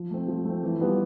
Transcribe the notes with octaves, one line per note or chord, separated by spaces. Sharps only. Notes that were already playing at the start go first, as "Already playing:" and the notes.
Already playing: F3
A3 C4
F3
A3 C4
E3
G3 B3 F4